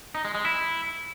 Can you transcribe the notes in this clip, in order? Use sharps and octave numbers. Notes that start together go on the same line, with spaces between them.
D#4
G#3
G#3
E4